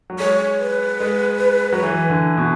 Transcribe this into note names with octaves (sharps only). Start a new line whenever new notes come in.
F#3
G#3 C#5
B4
G#3
F#3
E3
D3
B2